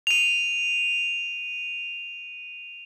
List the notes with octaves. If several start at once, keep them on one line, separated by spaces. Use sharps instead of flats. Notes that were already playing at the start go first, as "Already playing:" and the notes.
D#7 F7